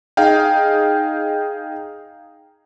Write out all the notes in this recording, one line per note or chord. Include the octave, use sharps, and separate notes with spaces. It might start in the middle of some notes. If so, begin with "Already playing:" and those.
D#4 G#4 D#5 F5 G5